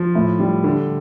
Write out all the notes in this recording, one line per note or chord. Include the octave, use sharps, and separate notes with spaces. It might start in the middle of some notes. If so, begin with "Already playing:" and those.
Already playing: F3
A2
G3
D3